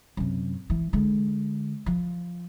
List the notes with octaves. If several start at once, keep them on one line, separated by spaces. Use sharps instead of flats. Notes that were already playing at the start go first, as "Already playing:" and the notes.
F#2 C3
E3
D3 G#3
F3